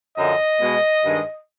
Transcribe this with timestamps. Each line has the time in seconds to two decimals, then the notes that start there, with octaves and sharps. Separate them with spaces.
0.16 F#2 D3 F3 D#5
0.60 B2 G#3
1.04 G2 D#3 G#3